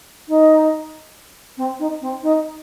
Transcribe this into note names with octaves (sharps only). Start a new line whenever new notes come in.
D#4
C4
D#4
C4
D#4